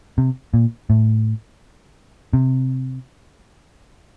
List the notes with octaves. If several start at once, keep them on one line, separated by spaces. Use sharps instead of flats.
C3
A#2
A2
C3